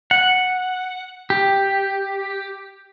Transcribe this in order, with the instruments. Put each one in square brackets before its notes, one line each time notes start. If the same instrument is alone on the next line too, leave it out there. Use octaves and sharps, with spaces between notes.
[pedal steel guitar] F#5
G4